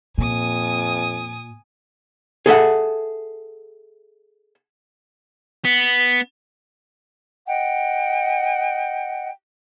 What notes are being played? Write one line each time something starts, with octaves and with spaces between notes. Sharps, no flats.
F2 A#2 G#5 D#6
G#4 A4 E5 F#5
B3
D#5 F#5 G5